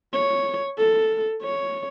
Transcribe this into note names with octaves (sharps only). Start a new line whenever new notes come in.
C#5
A4
C#5